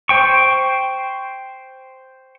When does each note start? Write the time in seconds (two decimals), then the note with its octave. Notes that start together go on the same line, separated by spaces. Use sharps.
0.09 C5 G5 C#6